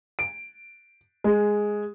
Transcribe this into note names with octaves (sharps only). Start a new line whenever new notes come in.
D7
G#3